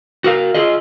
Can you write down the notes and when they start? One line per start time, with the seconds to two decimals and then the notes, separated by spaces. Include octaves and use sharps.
0.24 F#4 A#4 F5
0.54 F4 G#4 D#5